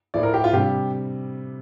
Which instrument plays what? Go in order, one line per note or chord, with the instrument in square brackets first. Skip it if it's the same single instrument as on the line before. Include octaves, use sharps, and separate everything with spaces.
[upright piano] A2 F3 A3 [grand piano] D5
[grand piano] A#4
G4
F4
[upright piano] C3 G3 D4 [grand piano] G4